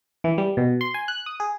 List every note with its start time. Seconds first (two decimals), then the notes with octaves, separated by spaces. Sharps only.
0.24 E3
0.38 G3
0.57 B2
0.81 C6
0.94 G#5
1.08 F#6
1.26 D#6
1.40 G#4